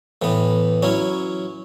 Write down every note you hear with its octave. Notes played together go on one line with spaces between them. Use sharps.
A2 E3 B3
F#3 C#4 E4